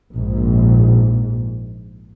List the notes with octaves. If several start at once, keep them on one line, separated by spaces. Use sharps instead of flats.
A#1 G#2